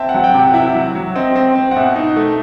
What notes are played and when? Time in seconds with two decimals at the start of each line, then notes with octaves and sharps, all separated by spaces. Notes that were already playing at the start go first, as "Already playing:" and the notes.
Already playing: C4 E5 G5 A5
0.09 F#5
0.14 F#3
0.24 G5
0.34 C3
0.39 F#5
0.54 E4 E5
0.75 F#3
0.95 F#3
1.15 C4 D#5
1.35 C4
1.55 C4
1.71 F#5
1.76 B2 E5
1.96 D#4
2.16 A3